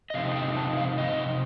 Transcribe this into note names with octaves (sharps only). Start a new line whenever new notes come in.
D#5
C3 F3 C4 D#4 F5
G5
A5
F5
D#5